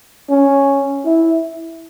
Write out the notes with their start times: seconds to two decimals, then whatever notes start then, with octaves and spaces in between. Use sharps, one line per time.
0.30 C#4
1.05 E4